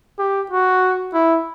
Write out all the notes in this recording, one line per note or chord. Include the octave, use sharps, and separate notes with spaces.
G4
F#4
E4